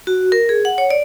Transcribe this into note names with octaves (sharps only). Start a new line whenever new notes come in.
F#4
A#4
G#4
F#5
C#5
D5